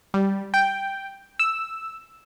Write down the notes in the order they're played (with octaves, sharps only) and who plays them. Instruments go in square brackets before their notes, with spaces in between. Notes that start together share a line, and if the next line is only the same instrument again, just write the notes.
[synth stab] G3
G5
E6